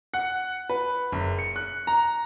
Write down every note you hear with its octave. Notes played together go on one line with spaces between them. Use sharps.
F#5
B4
F#1
C#7
F#6
A#5